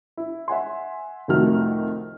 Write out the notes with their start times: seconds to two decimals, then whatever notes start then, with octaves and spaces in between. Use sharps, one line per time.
0.17 E4
0.48 E5 F#5 G#5 C6
1.28 C2 F2 D#3 A3 F#4 F6